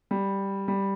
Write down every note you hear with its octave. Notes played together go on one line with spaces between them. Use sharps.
G3
G3